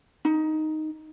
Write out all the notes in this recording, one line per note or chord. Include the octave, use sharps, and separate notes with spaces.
D#4